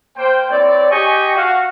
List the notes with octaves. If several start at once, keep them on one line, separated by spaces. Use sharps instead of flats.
A#3 C5 G5
C4 E4 C#5 D5
G4 G#4 D#5 G5 G#5 C#6
F#4 F5